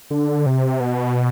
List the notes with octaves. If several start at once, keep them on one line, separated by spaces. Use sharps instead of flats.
D3
C3
B2